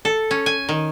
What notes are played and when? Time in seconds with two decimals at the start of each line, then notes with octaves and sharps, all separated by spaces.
0.05 A4
0.31 C#4
0.46 G#5
0.69 D#3